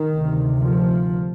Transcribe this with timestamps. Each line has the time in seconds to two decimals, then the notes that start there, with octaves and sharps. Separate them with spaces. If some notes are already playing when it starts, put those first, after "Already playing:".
Already playing: D#3
0.12 D2 C3
0.61 F3